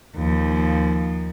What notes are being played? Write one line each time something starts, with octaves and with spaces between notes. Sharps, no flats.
D#2 F3